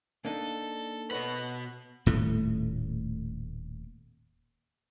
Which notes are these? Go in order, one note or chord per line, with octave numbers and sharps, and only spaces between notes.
A#3 D4 D#4 A4
B2 B4 C#5 D#5 F#5 B5
D#1 A2 A3